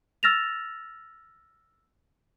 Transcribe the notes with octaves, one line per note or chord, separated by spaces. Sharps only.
E6 F6 A6 A#6 E7 F7